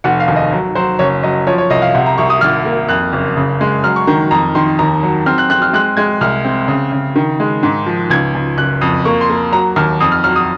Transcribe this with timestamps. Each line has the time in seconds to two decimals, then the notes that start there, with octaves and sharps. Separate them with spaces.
0.04 F1 F#5
0.20 F5
0.28 D#2
0.36 D#5
0.52 F#3
0.75 F#3 C5
0.99 F#1 C#5
1.23 F#3 D#5
1.47 F3 C#5
1.58 C#5
1.70 C2 D#5
1.82 F5
1.94 C3 F#5
2.06 A#5
2.18 C2 C#6
2.30 D#6
2.41 G#1 F6
2.65 A#3
2.89 F2 F#6
3.13 F#1
3.37 C#3
3.61 G#3
3.84 F#3 F6
3.96 C#6
4.07 D#3 A#5
4.31 F2 A#5
4.55 D#3 C6
4.79 D#2 A#5
5.03 F#3
5.26 C4 F6
5.38 F#6
5.50 C4 F#6
5.62 F6
5.73 G#3 F#6
5.97 G#3 G#6
6.21 C2 F6
6.44 C4
6.68 C#3
6.92 C#3
7.16 D#3
7.40 G#3
7.63 G#2
7.86 F3
8.10 C#2 G#6
8.35 C#2
8.58 F#1 F#6
8.81 F2 D#6
9.05 A#3 C#6
9.21 C6
9.30 A#3
9.52 F#3 A#5
9.76 D#2 F6
10.00 F2 D#6
10.12 F6
10.24 F#3 F6
10.36 D#6